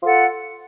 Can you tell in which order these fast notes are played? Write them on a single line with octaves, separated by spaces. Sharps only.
F4 A4 F#5